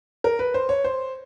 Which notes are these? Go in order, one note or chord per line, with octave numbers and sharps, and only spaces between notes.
A#4
B4
C5
C#5
C5